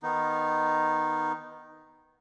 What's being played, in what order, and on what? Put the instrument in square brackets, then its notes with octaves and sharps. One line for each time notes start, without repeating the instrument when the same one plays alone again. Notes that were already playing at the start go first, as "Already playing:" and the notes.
[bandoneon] D#3 B3 D#4